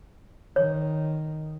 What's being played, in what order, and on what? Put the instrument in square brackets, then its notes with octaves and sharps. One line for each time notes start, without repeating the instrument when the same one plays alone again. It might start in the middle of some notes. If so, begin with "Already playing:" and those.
[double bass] D#3 [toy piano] C#5